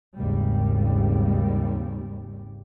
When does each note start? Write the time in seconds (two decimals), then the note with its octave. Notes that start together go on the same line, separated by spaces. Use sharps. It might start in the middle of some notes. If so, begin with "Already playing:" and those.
0.16 G#1 D#2 G#2 C#3 G3